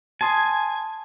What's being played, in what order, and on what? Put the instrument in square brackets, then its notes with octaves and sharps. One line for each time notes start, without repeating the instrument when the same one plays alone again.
[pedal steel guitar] G#5 [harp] A5 C6 D#6